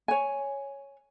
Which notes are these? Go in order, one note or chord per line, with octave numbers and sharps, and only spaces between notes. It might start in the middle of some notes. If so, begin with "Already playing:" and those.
C#5 G#5